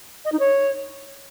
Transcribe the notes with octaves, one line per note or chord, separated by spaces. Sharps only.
D#5
D#4
C#5